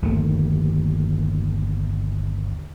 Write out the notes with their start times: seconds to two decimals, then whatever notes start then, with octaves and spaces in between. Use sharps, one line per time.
0.02 G1 D#2 D#3 A3